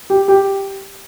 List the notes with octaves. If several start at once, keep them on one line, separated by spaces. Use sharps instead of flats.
G4
G4